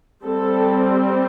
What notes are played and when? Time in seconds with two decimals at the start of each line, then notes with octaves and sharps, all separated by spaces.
0.23 G3 C4 A4